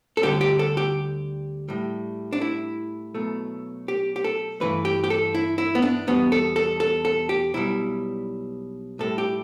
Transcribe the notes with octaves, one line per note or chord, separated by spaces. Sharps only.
A4
D2 D3 G3 G4
G4
A4
G4
A2 G3
D4
E4
B1 B2 A3
G4
G4
A4
G2 E3 A3 B4
G4
G4
A4
E4
E4
B3
D4
E2 B2 G3 B3
A4
A4
A4
A4
G4
B1 B2 G3 E4
A2 G3 A4
G4